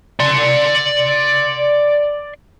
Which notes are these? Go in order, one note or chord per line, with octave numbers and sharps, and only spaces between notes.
D5 C6